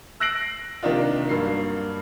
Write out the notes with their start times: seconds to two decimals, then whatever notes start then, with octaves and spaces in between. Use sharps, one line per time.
0.20 E6 F#6 A#6 C7 D7 F#7
0.83 C3 D#3 A#3 D4 D#4 F4
1.29 G2 F#3 A#3 C7